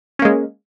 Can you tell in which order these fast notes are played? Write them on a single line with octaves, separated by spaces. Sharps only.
C#4 A#3 G#3